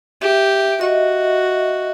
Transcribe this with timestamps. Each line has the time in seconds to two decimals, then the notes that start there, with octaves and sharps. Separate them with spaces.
0.22 G4 E5
0.81 F#4 D#5